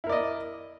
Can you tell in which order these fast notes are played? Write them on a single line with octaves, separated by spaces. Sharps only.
E4 A#4 D5 D#5